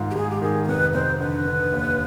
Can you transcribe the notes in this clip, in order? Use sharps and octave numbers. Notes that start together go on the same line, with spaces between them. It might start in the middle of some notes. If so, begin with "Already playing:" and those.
Already playing: G#2 D#3 F4
G4
G#2 G#4
G4
D#3 G#4
G#4
F1 B4
F1 C5
D3 B4
D3
D#2